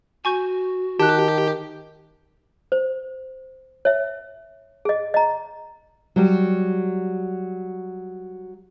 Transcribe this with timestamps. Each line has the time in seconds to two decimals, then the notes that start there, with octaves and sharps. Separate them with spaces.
0.25 F#4 G#5 C#6 G6
1.00 D#3 G4 A5 F#6
2.72 C5
3.85 C#5 E5
4.85 G#4 D#5
5.14 D#5 A#5
6.16 F#3 G3